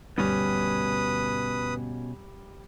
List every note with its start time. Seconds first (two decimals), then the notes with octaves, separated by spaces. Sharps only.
0.18 D2 G2 B2 G3 C#4 B4 D#6